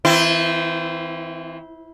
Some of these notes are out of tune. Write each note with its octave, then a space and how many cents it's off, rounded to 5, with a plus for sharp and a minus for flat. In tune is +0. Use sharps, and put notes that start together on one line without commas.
E3 -25 C4 -20 E4 +35